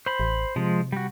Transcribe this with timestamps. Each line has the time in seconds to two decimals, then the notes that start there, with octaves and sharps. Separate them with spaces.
0.06 C5 B5
0.20 A1
0.56 C3 F3 G#3
0.92 G3 F#4